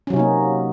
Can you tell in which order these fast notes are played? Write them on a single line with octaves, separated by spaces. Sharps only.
C#4 F#3 C3 D#4 A#3